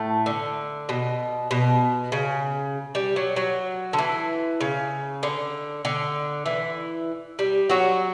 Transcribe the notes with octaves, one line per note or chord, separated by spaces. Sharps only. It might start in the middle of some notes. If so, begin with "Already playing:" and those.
Already playing: A2 A3
D3
B2
B2
C#3
G3
F#3
F#3
D3
E3
C#3
D3
D3
E3
G3
F#3 F#4